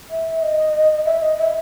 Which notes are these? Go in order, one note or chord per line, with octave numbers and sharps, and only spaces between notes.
E5
D#5
E5
D#5
E5